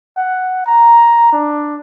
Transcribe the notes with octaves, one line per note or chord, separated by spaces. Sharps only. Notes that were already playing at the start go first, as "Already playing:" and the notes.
F#5
A#5
D4